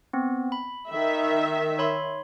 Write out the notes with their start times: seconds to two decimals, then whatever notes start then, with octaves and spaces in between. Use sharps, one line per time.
0.13 B3 C4
0.52 B5
0.90 D#3 E5
1.79 C#5 B5 C6